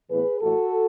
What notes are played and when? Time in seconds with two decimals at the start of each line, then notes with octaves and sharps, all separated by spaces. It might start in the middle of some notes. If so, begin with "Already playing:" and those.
0.10 A2 E3 B3 G#4 B4
0.41 A2 E3 A3 F#4 A4